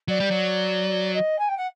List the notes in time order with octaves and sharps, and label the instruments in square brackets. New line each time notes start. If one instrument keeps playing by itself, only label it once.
[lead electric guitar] F#3 [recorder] D5
[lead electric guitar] G3
F#3
[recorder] D#5
G#5
G5
F#5